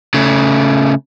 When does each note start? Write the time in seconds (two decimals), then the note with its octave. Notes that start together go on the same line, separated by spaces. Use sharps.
0.14 C#3 A3